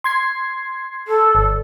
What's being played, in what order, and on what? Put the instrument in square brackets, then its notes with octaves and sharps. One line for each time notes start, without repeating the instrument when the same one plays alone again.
[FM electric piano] C6 G#6 C7
[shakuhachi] A4
[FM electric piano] G1